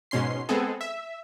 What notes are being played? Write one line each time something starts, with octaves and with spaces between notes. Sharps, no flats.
G#2 B2 C#4 C6 C7
G#3 B3 C4 G#4 A4
E5